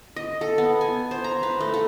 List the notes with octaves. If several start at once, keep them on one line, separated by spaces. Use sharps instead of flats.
D#5
A4
B3
G#5
C5
A#5
B4
A3
A4